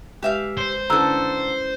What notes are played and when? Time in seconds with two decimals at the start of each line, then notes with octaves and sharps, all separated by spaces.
0.22 G#3 G4 B4 E5 F5
0.57 C5
0.90 D3 C#4 E4 A4 B4 A#5 E6